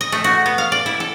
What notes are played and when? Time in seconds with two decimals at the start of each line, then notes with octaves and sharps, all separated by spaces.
0.01 D#5
0.12 A3
0.24 F#4
0.46 B3
0.58 F5
0.72 D5
0.86 E4
1.00 A4